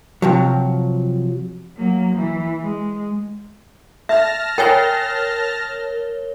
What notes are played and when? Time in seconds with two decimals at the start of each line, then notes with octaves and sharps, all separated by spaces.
0.22 C3 F3 F#3
1.77 F#3 A#3
2.15 E3
2.62 G#3
4.09 E5 A5 F6 A#6
4.58 A#4 C#5 G5 G#5 G7